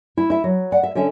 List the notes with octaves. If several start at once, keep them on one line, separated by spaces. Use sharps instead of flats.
E4
E4 E5
F#3
D5 F#5
E5
D3 C#4 C#5 E5